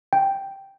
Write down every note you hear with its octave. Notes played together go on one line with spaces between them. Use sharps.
G5